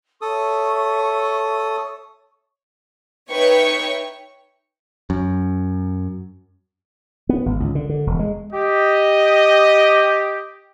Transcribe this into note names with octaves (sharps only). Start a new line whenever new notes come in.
A4 C#5 E5 C#6 D#6
D#4 B4 C#5 E5 G5 C#6
F#2
B3
G#1
C#2
D3
D3
E1
G#3
G4 D#5